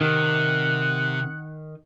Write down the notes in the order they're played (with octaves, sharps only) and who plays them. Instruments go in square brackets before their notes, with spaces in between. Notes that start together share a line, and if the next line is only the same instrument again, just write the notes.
[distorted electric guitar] C3 [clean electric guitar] D#3 [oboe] F#5